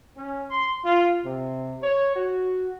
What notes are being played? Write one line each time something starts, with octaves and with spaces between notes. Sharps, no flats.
C#4
C6
F4
C3
C#5
F#4